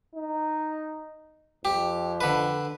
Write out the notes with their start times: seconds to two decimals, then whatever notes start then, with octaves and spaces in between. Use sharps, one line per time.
0.16 D#4
1.65 F2 G4
2.21 D3 B4